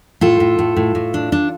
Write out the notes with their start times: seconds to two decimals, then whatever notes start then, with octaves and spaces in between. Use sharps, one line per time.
0.21 A2 F4 A4
0.40 A2
0.59 A2
0.76 A2
0.95 A2
1.14 D4
1.32 D4